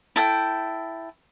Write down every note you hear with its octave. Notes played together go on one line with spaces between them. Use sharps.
E4 A4 G5